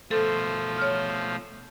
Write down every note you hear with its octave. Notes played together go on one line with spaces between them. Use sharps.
B2 F3 A3 A4 C5
C#5 F6